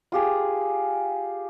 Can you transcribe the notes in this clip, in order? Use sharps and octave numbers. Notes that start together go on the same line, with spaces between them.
F4 G4 G#4